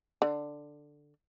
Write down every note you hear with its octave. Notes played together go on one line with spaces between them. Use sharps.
D3